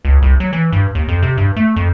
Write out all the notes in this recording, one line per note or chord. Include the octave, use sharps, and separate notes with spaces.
C#2
C2
F#3
E3
G2
D#2
F2
C3
G2
A3
F2